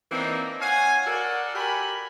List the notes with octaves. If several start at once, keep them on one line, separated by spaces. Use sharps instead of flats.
E3 A#3 C4 D4 D#4
C#5 F5 F#5 G#5
F#4 A4 A#4 D5 F#5
G4 A#4 G#5 B5